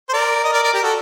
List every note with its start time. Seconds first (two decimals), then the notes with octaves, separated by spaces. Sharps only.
0.09 C5
0.13 A#4 D5
0.44 D#5
0.52 A#4 D5
0.63 A#4 D5
0.73 G4 A#4
0.83 F#4 A4